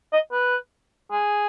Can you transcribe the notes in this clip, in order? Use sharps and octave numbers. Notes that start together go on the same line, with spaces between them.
D#5
B4
G#4